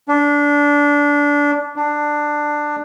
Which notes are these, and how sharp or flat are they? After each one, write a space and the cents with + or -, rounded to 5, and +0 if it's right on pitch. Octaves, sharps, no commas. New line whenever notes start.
D4 -20
D4 +10